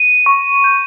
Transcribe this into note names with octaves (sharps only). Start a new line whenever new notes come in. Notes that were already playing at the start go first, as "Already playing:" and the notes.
Already playing: D#7
C#6
G6